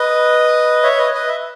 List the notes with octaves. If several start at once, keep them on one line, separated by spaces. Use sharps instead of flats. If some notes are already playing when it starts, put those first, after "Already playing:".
Already playing: B4 D#5
C#5 E5
B4 D#5
B4 D#5
E5